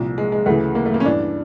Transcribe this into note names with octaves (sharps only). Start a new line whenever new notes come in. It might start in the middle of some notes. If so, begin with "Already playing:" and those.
Already playing: C2 A#2 F3
G#3
G#3
D2 C#3 E3 A3
A#3
A3
A#3
C#4
G2 E3 D4